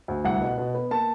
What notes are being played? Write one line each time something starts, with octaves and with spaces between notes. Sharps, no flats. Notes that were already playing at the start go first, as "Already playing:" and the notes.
D2
C2 F#5
B2
B2
B3
A#3 A5